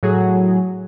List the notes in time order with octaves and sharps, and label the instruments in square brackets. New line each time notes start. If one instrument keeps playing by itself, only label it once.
[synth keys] A2 F#3 F#4 G#4